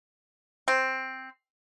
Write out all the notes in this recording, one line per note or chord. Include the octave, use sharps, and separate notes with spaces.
C4